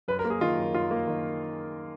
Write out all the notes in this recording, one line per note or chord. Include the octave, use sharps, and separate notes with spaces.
F#2 B4
A#4
A#3
G#4
D#3 F4
F#2
F#2 F4
A#3
D#3